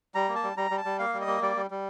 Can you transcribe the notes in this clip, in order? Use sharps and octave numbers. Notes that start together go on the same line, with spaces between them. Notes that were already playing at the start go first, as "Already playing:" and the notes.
G3 A#5
A#3
A5
G3
G3 A#5
G3
A5
G3
A#3 F5
G3
D#5
A#3
G3 D5
G3
G3